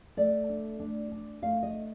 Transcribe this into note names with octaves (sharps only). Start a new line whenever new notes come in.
A3 D5
D4
D4
D4
A3 F5
D#5